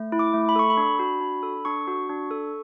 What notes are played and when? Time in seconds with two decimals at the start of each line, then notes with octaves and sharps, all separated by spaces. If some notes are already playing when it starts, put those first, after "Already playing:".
Already playing: A3
0.12 E4
0.19 D6
0.34 A3
0.49 B5
0.56 A4 C#6
0.70 B5
0.77 D4
0.99 F#4
1.21 D4
1.43 A4
1.65 D4 C#6
1.88 F#4
2.09 D4
2.31 A4